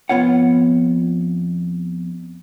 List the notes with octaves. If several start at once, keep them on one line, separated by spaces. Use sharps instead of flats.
F2 E3 B3 F4 C#5 F#5